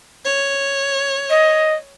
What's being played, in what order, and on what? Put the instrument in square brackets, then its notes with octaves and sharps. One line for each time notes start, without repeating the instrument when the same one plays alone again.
[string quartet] C#5
[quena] D#5